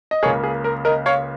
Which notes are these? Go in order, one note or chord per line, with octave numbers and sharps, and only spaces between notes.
D#5
C#2 C#3 A#3 G#4 C#5
G#4
A#4
A#4 D#5
C#5 F5